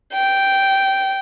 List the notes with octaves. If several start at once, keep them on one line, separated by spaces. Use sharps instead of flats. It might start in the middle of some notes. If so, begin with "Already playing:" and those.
G5